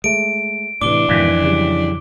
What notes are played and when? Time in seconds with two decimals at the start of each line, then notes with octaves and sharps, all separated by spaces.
0.04 G#3 A3 D7
0.81 A2 C3 E3 D4 D6 G7
1.08 F2 G#2 B2 D#3 E3
1.42 C#3 F#3 G3